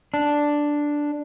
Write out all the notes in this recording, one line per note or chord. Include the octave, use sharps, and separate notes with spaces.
D4